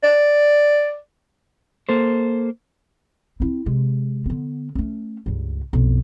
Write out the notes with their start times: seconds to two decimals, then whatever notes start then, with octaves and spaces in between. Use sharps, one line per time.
0.03 D5
1.89 A#3 A4 C5
3.40 C4 E4
3.66 C3 G#3
4.26 D3 B3
4.75 A3 C#4
5.26 C#2 G2
5.73 B1 F2